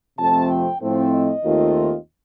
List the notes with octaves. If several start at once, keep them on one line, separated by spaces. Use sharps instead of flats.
F2 C3 F3 A3 C4 A5
G5
A2 F3 A3 C4
D#5
D#2 D#3 A3 C4 F4